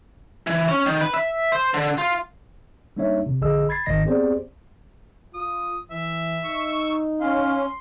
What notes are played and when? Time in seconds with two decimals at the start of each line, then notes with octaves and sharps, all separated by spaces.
0.47 E3
0.69 C#4
0.86 D#3
1.01 B4
1.14 E5
1.52 C5
1.74 D3
1.98 F4
2.97 G3 A#3 D4 D#4 C#5 E5
3.26 C3
3.41 A#1 D3 G#4 D#5 E6
3.69 B5 G#6 A6 C7
3.86 G#1 G#2 D#3 D#5 A#6
4.05 B3 C4 G4 G#4 C5 D5
5.34 F4 D#6
5.91 E3 E5
6.44 D#4 C#6 E6
7.21 C#4 F5 C6